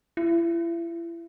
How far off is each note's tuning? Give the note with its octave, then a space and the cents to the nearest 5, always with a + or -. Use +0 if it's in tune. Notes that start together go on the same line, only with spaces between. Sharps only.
E4 +35